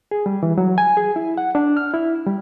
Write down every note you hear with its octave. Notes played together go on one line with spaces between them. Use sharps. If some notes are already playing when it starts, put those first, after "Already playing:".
G#4
G3
E3
F#3
G#5
G#4
E4
F#5
D4
F6
E4
G3